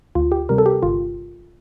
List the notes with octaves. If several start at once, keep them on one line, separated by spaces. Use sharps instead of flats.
D2 F4
G4
C3 G3 A#4
A4
G4
G1 F4